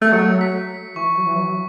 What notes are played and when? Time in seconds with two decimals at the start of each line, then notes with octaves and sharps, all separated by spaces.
0.02 A3
0.13 F#3 C#7
0.41 B6
0.96 E3 C#6
1.17 F#3
1.26 E3
1.36 F#3